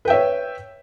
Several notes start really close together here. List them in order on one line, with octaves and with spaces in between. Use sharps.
B4 G5 E5 C#5